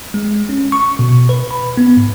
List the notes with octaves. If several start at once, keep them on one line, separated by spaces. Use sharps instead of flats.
G#3
C#4
C#6
B2
B4
B5
B3
G#2